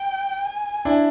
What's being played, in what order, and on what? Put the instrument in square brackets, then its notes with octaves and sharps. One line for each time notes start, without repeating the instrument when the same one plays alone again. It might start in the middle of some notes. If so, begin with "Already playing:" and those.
Already playing: [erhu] G5
G#5
[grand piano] D4 E4